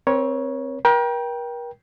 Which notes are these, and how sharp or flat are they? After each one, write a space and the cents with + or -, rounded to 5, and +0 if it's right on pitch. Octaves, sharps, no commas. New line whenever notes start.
C4 +5 A#4 +45 C#5 +0
A#4 +40 G5 +0